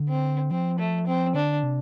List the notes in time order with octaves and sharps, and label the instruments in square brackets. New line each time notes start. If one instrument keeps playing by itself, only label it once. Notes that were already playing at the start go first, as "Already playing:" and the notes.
Already playing: [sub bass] D3
[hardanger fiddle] C4
[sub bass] F3 [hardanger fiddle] C4
[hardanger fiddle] A3
C4
[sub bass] D3 [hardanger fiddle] D4
[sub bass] C3